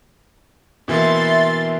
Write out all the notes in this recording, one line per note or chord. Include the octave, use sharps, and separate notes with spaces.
B2 E3 A#3 E5 C6 A6